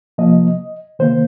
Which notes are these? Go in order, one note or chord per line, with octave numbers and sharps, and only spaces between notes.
C3 F3 A#3 D#5
C3 D#3 A#3 C5